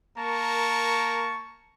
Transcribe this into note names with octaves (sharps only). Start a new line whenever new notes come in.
A#3 A#4 A5 C#6